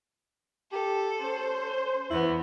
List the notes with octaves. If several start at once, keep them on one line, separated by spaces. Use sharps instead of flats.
G4 A4
C#4 C5
E2 B3 E4